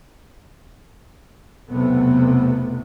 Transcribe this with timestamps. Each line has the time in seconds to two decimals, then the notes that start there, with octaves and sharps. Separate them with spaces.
1.71 B1 E2 C3 A3 B3